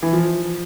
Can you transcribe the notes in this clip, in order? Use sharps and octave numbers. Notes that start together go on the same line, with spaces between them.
E3
F3